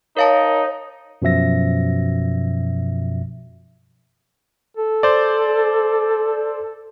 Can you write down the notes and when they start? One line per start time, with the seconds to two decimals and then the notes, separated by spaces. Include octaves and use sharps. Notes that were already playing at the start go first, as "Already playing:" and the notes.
0.17 D#4 A#4 C#5 F5 A5
1.22 F#2 B2 F3 E5 A#6
4.77 A4
5.03 C5 D5